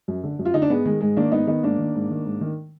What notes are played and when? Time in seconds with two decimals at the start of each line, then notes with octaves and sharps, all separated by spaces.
0.08 F#2
0.23 D3
0.39 F#2
0.45 F4
0.54 D3 D#4
0.62 D4
0.70 G#2 G#3 B3
0.85 D#3 G#3
1.01 G#2 G#3
1.17 D#3 A#3 D4
1.32 G#2 B3 D#4
1.47 D#3 B3 D#4
1.63 G#2 A#3 D4
1.79 D#3
1.95 G#2
2.11 D#3
2.26 G#2
2.41 D#3